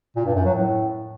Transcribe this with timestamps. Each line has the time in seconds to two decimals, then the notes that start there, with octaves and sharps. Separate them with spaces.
0.16 A#2
0.26 G2
0.35 F#2
0.45 F#3
0.54 A2